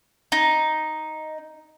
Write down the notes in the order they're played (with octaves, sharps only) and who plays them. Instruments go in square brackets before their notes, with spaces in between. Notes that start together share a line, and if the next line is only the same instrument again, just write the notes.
[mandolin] D#4